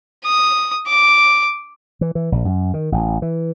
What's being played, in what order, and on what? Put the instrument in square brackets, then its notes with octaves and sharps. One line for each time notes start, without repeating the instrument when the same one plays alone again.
[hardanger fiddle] D#6
D6
[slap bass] E3
E3
A#1
F#2
D#3
A1
E3